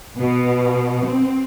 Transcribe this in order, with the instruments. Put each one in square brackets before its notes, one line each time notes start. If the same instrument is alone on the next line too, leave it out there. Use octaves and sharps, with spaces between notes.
[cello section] B2
C4